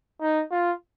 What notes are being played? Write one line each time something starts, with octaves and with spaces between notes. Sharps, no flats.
D#4
F4